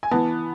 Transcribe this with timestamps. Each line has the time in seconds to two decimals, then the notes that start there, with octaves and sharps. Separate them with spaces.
0.03 G#5
0.11 E3 B3 A5